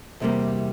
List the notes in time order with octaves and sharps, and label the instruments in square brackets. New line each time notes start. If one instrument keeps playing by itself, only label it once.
[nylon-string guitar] E2 C3 E3 G3 A#3